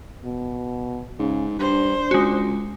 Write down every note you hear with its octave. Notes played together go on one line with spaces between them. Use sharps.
B2
G#2 C#3
G2 D4 C5
C#2 G#3 F#4